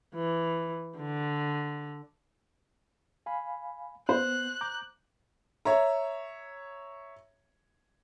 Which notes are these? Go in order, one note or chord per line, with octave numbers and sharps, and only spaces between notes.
E3
D3
F5 G#5 B5
B3 C5 F#6
A#5 D6 G6
C#5 E5 A#5